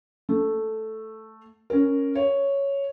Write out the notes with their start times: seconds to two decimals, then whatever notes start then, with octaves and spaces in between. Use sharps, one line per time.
0.29 A3
1.70 C#4 A#4
2.15 C#5